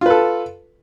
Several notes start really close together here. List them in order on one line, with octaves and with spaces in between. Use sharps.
F4 B4 A4